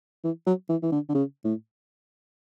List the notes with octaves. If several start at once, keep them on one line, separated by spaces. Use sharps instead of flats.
E3
F#3
E3
E3
D3
D3
C#3
A2